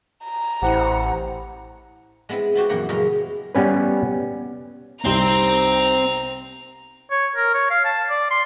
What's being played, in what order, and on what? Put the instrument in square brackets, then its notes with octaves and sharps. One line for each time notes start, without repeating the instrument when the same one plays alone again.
[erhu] A#5
[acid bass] A1 [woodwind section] E4 G4 C5 [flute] F#5
[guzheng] G#3 B3 C4 E4
B3 C4 F#4 G4
F#2 A#2 E3 A#3 G4 F#5
F#2 C#3 G#3 E4 A#5
[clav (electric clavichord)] G3 B3 C#4 B4
[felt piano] C2 G3 D#4 [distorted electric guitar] C4 C5 [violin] A#5 F7
[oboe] C#5
A#4
C#5
F5
A5
D5
C6